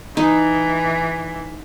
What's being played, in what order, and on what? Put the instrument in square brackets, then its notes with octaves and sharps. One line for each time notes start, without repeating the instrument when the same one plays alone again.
[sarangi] E3 [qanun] D#4